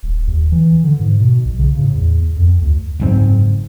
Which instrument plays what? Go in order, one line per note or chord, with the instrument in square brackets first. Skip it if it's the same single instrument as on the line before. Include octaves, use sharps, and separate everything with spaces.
[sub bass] D#1
D#2
E3
D3
G#2
B2
B1
C#3
A2
E2
F2
D2
[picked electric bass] F#1 G#2 C4